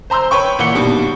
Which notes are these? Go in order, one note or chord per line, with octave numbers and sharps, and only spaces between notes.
C5 A#5 C6 E6 G6
B4 C#5 G5 C#6
A#2 E3 E4 F#5 C#7 G7
G2 B2 D#3 G3